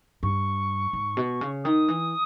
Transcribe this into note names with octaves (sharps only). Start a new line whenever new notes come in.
G2 C#6
G#2
B2
C#3
D#3 D#6
E3